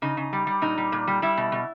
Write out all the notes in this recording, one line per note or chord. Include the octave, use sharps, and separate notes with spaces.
C#3 D#4
C#3
G3
G3
A#2 D#4
G3
A#2
G3
G3 E4
B2
B2